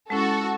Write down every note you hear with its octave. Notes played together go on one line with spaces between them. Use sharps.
G#3 C#4 E4 F#4 A4